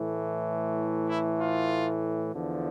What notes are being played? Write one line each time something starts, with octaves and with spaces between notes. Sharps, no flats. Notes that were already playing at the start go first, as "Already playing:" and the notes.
Already playing: A2 E3 A3
E4
F4
E2 D3 F3